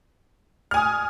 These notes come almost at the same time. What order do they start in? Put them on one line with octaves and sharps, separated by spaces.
F6 G#5 D#6